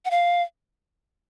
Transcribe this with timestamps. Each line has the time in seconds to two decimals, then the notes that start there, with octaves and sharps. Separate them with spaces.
0.05 F#5
0.11 F5